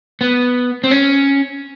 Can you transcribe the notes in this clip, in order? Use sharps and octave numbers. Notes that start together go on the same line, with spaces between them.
B3
C4
C#4